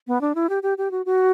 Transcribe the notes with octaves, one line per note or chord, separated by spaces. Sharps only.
B3
D4
E4
G4
G4
G4
F#4
F#4